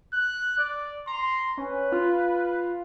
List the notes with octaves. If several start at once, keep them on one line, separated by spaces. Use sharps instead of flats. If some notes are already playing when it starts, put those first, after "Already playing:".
F#6
D5
A#5 C6
C#4 B4
F4